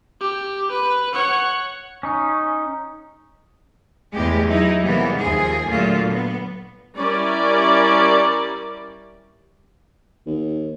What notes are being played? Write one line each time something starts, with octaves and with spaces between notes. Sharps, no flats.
G4
B4
C#5 F#5
C#4 D#4
E2 A2 G#3 G4
F#3 D#4 E4
C3 E3 G3 G#3 A#3 B3
D#2 F3 G#4
A#2 D3 F#3 A3 F4
B3
G3 C#4 E4 A#4 D5
D#2